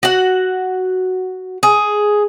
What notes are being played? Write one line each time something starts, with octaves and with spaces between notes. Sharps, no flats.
F#4 F#5
G#4